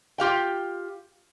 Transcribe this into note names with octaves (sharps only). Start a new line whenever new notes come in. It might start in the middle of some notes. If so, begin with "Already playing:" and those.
F4 G4 F5 G5